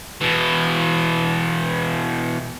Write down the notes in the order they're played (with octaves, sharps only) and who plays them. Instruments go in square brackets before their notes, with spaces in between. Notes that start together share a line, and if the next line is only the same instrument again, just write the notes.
[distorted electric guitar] B2 E3